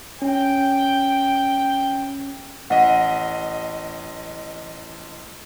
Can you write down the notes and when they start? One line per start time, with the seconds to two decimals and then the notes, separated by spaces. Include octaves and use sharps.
0.22 C#4 G5
2.70 A1 D#5 F#5 B6